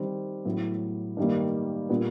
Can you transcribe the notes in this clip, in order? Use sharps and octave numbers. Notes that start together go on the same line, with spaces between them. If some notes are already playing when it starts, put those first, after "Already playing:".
Already playing: D#3 G3 C4
A2 F#3 B3 E4
G2 D#3 G3 A#3
A#2 G3 B3